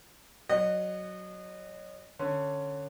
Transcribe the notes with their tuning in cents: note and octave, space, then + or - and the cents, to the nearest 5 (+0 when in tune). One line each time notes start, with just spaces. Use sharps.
F#3 +0 D#5 -25 F#5 +0
D3 +10 C#4 +0